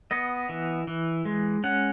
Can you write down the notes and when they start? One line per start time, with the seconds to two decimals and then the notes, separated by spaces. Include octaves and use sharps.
0.11 B3 D#5
0.49 E3
0.87 E3
1.25 G#3
1.64 C#4 F#5